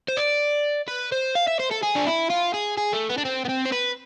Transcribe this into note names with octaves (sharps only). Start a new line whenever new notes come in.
C5
D5
B4
C5
F5
E5
C5
A4
G#4
D4
E4
F4
G#4
G#4
A3
B3
D4
C4
B3
C4
C5
B4